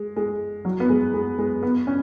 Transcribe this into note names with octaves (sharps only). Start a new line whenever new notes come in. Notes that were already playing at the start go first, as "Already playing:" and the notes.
Already playing: G#3
G#3
F#3
B3
G#3
G#3
G#3
B3
C#4